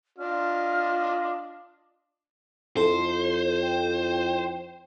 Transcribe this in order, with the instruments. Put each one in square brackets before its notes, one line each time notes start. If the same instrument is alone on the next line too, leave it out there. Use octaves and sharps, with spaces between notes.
[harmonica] D4 D#5 [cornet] F4 [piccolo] F6
[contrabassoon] F2 [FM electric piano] E4 A4 [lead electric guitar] C5
[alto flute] G5